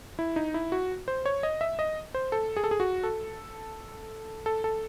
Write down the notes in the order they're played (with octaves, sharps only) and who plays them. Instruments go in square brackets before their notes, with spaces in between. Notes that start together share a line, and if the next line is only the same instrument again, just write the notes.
[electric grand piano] E4
D#4
E4
F#4
C5
C#5
D#5
E5
D#5
C5
A4
G#4
A4
G#4
F#4
A4
A4
A4